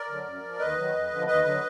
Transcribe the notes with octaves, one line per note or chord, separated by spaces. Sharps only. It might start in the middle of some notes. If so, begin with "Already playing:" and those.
Already playing: A#4 D5
D3 F#3
F#2
F3
D#2 B4 D#5
D#3 F#3
F2
D3 F3
D#2 B4 D#5
D3 F#3